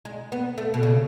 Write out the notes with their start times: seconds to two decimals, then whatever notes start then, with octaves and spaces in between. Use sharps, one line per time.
0.05 G#3
0.32 B3
0.58 A3
0.74 B2
0.83 C#3